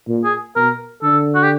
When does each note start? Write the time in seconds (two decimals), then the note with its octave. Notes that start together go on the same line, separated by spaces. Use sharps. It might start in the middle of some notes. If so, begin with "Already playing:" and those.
0.08 A#2
0.24 G#4
0.56 B2 A#4
1.03 D3 A4
1.35 F#4
1.43 G4